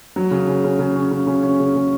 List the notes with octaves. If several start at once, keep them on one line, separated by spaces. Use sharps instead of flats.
F#3
C#3
C#3
C#3
C#3
C#4
C#3
C#3
C#4
C#3
C#3